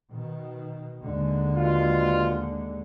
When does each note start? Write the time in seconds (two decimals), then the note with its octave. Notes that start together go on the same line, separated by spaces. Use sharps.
0.11 B2 D#3
1.02 D#2 D3 G#3
1.56 C2 B2 F4